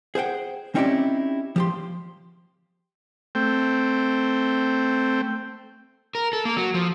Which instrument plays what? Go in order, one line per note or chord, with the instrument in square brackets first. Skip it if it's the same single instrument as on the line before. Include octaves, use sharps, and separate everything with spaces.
[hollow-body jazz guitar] G#4 C5 F#5 G5
C4 C#4 D#4 E4 G4 D5
F3 G4 C6
[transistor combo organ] A3 C4 G5
[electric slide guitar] A#4
A4
A#3
F#3
F3